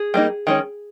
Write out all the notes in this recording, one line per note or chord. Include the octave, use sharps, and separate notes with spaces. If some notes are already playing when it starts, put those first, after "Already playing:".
Already playing: G#4
G3 A#3 D#4
D#3 G#3 C#4